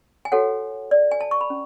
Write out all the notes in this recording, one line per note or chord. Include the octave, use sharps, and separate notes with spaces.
G#5
F#4 A4 C#5 F#5
D5
G#5
A5
C#6
B5
C#4